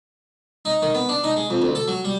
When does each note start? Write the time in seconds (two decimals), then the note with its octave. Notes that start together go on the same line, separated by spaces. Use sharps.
0.65 D#4
0.82 D#3
0.94 B3
1.09 D4
1.24 D#4
1.36 G#3
1.50 F2
1.62 D2
1.75 A4
1.88 F#3
2.05 G3